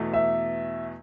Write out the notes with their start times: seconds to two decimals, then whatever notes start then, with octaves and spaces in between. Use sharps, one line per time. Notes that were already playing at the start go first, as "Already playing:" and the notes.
Already playing: E2 B2 A3
0.14 E5